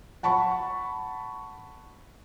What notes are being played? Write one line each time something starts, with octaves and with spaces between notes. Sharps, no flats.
F#5 A5 B5 C#6